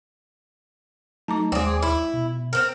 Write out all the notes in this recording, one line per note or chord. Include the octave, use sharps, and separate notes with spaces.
F#3 A3 D#4 A5 A#5 D6
D#2 G#3 C4 G#4 D5 D6
E4
B2
C4 A#4